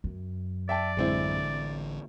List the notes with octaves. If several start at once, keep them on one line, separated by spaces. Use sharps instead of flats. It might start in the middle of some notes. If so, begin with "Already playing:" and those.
F#2
D5 E5 G5 A5
A1 D3 G#3 C4 E4